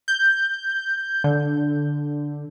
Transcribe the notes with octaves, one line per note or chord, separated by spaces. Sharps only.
G6
D3